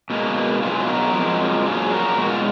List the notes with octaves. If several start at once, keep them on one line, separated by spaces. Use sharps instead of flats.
B2 G#3 A#3
B2 F#3 F4 G#4
F#4 A#4
F2 F3 G#3
A#2 F#3 F4 G#4
F#4 A#4
B2 G#3 F#4
F4